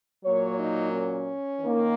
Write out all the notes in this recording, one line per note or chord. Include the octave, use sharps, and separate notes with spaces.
A#2 F#3 A#3 C#5
D#4
C#4
D#3 A#3